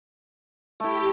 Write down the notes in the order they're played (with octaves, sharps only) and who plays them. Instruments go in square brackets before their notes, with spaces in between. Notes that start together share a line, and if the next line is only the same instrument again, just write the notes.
[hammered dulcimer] A3 E4 [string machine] G4